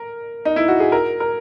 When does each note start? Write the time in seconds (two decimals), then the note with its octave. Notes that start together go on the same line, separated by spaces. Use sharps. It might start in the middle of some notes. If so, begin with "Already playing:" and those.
Already playing: A#4
0.45 D#4
0.56 E4
0.68 F#4
0.80 G#4
0.92 A#4
1.20 A#4